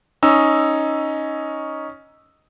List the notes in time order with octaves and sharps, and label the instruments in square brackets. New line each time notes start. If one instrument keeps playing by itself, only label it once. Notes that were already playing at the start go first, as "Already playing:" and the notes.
[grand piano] C#4 D#4 E6